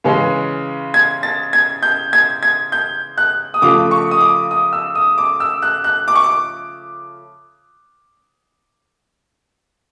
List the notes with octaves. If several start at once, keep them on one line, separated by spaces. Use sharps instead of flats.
C#3 E3 G#3 C#4
G#6
A6
G#6
G6
G#6
G#6
G6
F#6
D#6
C#3 F3 A3 D6
C#6
D#6
D6
D#6
E6
D#6
D6
E6
F#6
F#6
D6
C#6
D6